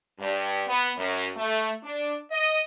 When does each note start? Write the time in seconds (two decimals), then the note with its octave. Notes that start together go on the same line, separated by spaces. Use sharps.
0.19 G2
0.67 B3
0.97 F#2
1.36 A3
1.83 D4
2.31 D#5